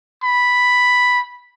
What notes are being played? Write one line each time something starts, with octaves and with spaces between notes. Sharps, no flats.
B5